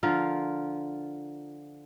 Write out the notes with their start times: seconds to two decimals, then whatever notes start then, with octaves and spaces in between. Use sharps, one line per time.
0.03 D3 F3 F4 A#4